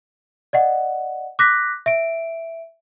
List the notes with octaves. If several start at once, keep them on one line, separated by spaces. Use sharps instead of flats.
D5 D#5 F#5
D6 F#6 A#6 B6
E5 D7